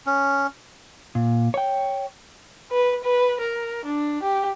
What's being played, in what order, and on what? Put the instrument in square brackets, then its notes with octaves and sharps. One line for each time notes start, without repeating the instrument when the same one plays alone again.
[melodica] C#4
[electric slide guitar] A#2
C#5 G5
[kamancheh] B4
B4
A#4
D4
G4